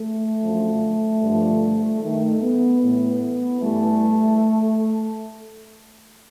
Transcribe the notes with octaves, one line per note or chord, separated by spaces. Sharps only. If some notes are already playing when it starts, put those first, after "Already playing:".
Already playing: A3
F#2 D3 F3
G2 D3 F3
G2 D#3 A3
B3
A2 E3 B3
G2 E3 A3